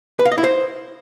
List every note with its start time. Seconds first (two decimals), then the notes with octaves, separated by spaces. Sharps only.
0.19 B4
0.25 F5
0.32 D#5
0.38 E4
0.44 C5